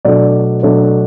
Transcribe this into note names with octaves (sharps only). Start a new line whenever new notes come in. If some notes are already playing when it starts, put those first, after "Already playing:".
B2 F#3 A3 D4 D5
B2 F#3 A3 D4